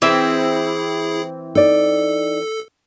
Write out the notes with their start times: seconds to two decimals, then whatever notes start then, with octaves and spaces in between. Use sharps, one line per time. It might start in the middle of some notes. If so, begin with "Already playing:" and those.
0.02 E3 C4 E4 G#4 E5
1.55 D#4 A4 D5